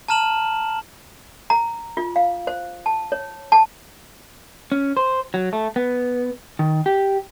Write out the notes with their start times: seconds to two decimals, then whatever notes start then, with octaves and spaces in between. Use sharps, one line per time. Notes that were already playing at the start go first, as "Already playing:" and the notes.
0.08 A5 A#5 F6 E7 F#7
1.50 A#5
1.97 F4
2.16 F5
2.47 C5
2.86 A5
3.12 C#5
3.52 A5
4.72 C#4
4.97 C5
5.34 F#3
5.53 A3
5.76 B3
6.59 D#3
6.86 G4